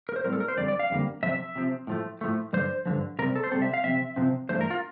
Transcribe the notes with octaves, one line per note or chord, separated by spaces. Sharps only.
A#4
C5
A2 G3 C4 A#4
A4
A#4
C5
F2 D3 G3 D5
D5
F5
F2 D3 G3 A#3
C3 F3 C4 E5
C3 F3 C4
A2 F3 A3
A2 F3 A3
G2 D3 F3 C5
G2 D3 F3
C3 G3 C4 A#4
A4
C5
C3 G3 C4 A4
E5
F5
C3 F3 C4 E5
C3 F3 C4
G2 E3 A3 C5
A#4
F4